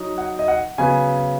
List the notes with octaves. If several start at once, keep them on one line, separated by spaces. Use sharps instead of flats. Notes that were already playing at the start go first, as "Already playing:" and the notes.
Already playing: F#3 D#4
F#5
D#5
F#5
C#3 F#3 B3 G#5